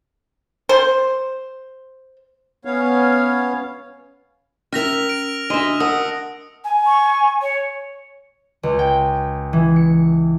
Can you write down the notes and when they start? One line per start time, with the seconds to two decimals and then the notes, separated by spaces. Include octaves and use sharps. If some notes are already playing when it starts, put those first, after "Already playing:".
0.69 C5
2.65 B3 C#4 C#5 F5
4.73 C#4 A#4 E5 F6 A#6 F7
5.09 D7
5.50 D4 F#4 D#5 E5
5.80 A#4 F#5 A5 D#6
6.64 G#5
6.86 C#6
7.42 C#5
8.63 C#2
8.79 G5
9.53 E3
9.76 C#7